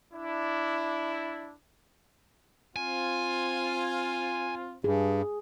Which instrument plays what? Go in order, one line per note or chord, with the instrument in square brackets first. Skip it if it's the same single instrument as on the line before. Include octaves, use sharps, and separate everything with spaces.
[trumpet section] D4 E4
[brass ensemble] C4 F4 [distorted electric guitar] G#5
[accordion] G2 [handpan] G#4